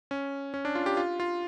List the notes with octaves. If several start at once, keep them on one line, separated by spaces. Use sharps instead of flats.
C#4
C#4
D4
F4
G4
F4
F4